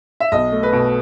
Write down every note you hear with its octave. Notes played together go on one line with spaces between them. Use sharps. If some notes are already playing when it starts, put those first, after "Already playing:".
E5
B1 D#5
A3
B4
B2